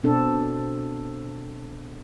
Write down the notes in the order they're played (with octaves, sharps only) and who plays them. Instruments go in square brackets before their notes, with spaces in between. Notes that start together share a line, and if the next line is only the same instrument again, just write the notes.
[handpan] B2 C4 D4 A4